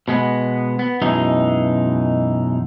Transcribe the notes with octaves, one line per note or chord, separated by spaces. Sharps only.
B2 G#3 B3
B3
F#2 B2 E3 G#3 D#4